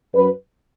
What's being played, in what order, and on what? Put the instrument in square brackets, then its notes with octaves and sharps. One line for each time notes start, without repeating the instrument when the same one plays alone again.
[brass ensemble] F#2 F#3 B4